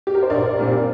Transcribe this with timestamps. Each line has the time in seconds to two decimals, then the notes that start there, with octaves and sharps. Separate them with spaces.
0.07 G4
0.15 A#4
0.23 C5
0.30 A#1 A#4 D5
0.59 A#2 G3 C4